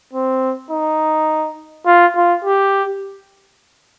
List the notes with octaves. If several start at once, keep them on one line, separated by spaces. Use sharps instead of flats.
C4
D#4
F4
F4
G4